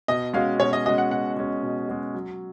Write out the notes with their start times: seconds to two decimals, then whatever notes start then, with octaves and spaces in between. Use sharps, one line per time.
0.08 B2 D#5
0.34 G#3 C#4 F#4 F5
0.59 B2 C#5
0.73 D#5
0.85 G#3 C#4 F#4 D#5
0.98 F#5
1.11 B2 F#5
1.37 G#3 C#4 F#4
1.63 B2
1.89 G#3 C#4 F#4
2.14 F#3